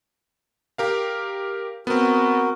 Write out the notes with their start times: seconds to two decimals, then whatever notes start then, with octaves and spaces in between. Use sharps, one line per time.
0.78 G4 A#4 F5
1.87 B3 C4 F#4 A#4